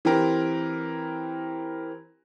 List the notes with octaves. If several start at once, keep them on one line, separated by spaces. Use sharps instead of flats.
E3 C4 G4 A#4